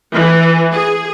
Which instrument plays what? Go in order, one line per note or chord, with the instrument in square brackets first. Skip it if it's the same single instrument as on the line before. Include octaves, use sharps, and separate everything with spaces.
[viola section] E3
G#4